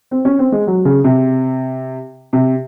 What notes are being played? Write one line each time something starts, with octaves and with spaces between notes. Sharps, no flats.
C4
C#4
C4
G#3
F#3
C#3
C3
C3